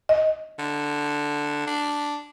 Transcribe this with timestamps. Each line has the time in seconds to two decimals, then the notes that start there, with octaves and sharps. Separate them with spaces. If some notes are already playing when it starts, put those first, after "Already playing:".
0.09 D#5
0.59 D3
1.67 D4